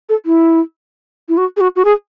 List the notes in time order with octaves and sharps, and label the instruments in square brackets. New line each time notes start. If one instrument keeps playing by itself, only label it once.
[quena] A4
E4
E4
F#4
G#4
F#4
F#4
G#4